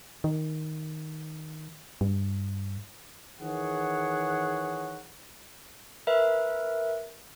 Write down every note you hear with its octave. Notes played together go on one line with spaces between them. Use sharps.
D#3
G2
D#3 E3 G#4 C#5 F#5
A#4 B4 E5